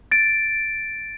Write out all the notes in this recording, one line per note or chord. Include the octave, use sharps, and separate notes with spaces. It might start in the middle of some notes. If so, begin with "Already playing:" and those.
A6 D7